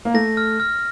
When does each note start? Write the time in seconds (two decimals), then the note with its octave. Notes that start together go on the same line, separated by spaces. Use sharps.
0.05 A#3
0.14 A3 A#6
0.37 F6
0.60 F6